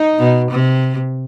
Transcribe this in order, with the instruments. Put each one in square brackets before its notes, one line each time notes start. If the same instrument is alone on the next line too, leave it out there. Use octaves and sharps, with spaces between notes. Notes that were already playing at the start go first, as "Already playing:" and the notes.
Already playing: [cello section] D#4
[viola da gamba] B2
C3